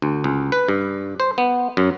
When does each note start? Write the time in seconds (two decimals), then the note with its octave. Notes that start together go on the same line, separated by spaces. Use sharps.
0.02 D2
0.24 C#2
0.52 B4
0.68 G2
1.20 C5
1.38 B3
1.77 F#2